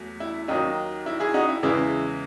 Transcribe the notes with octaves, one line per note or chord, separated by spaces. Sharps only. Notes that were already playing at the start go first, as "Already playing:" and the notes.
Already playing: E2 F#3 A3
E4
D#2 D#3 F#3 D#4
E4
E4 G#4
D#4 F#4
E4
E2 C#3 E3 G#3 E4